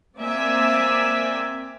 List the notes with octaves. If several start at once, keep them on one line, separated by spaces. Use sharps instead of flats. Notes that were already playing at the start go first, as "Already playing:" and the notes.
A#3 C4 D5 E5 G#5